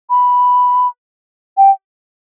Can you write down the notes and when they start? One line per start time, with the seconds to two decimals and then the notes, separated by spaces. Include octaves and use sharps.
0.10 B5
1.57 G5